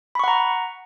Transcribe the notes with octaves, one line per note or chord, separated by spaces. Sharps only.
F#5 A#5 B5 C#6